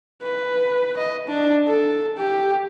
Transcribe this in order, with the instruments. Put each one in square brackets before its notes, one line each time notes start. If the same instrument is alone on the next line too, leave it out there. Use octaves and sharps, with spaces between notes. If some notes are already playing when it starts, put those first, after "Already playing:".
[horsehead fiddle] B4
D#5
D4
A4
G4